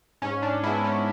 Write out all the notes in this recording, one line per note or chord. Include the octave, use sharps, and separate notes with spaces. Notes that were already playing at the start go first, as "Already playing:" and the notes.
G#2 C#4
D4
G#3 B3 E4
C#4